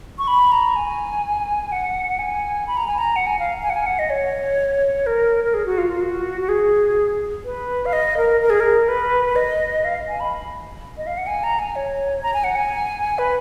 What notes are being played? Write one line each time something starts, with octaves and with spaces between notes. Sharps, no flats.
C#6
B5
A#5
G#5
F#5
G#5
B5
A#5
G#5
A#5
F#5
G#5
F5
G#5
F#5
G#5
F#5
D#5
C#5
A#4
A#4
G#4
F#4
F4
F4
F#4
F#4
G#4
B4
F5
D#5
A#4
A#4
G#4
A#4
B4
D#5
F5
G#5
B5
D#5
F5
F#5
G#5
A#5
G#5
C#5
A#5
G#5
F#5
G#5
B4